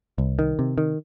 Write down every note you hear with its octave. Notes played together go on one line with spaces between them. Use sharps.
C2
D#3
C3
D#3